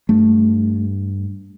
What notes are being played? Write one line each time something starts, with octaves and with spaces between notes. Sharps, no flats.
G2 A3